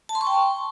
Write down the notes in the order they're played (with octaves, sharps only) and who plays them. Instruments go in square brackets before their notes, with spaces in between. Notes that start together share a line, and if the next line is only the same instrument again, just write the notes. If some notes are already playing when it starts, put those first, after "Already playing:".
[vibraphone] A5
C6
C#6
G5